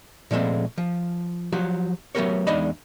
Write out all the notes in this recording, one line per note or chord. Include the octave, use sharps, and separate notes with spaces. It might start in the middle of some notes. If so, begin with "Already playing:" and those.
A#2 F3 G#3 A3 C4
F3
F3 F#3 F#4 G4
F#3 A3 B3 G4 A#4 C#5
E2 G#3 D4 D#4 D#5 B5